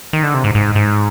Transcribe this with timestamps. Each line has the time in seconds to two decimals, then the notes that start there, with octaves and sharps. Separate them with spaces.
0.13 D#3
0.23 D3
0.34 C3
0.44 G#2
0.55 G#2
0.75 G#2